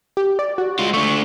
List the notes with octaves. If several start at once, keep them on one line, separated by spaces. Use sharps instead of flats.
G4
D5
F#4
G#3 F4
A3 D4 C#6